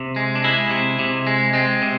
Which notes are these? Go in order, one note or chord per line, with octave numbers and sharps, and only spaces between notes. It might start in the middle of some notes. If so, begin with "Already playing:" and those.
Already playing: C3
G#3
D4
G#3 E4
C3
C3
G#3
G#3 C4
C3